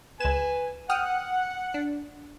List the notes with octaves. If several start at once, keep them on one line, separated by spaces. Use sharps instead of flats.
C#2 B4 G#5 E7
F#5 G5 D#6 F6
D4